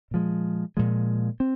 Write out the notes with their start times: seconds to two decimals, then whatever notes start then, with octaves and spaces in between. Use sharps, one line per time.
0.11 A#2 F3 G#3
0.77 A#2 F3 G#3
1.40 C4